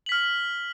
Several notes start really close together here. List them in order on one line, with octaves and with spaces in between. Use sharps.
F#7 B6 F6